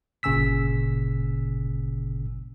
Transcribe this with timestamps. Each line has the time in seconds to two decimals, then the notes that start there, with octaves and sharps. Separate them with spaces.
0.23 G1 A#2 C#3 G#5 E6 B6